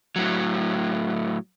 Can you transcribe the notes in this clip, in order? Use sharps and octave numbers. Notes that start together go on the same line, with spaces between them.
A2 F#3